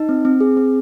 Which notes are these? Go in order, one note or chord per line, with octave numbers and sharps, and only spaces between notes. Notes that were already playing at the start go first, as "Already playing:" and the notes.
Already playing: D#4
C4
C4
G#4
C4